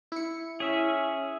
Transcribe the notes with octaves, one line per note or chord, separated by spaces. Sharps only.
E4 C#7
C#4 G#4 E5